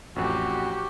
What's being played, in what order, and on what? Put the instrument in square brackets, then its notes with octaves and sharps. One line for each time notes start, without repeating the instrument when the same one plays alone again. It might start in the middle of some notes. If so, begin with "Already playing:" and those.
[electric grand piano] A1 F2 [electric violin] F#4 G4